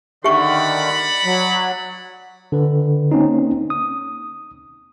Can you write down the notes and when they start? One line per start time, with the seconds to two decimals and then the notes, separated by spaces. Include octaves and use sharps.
0.24 D3 D#3 G4 D5 E5 F#5 B5 C#6
1.25 F#3
2.52 D3 B4
3.11 A#3 C4 C#4 D#4
3.70 D#6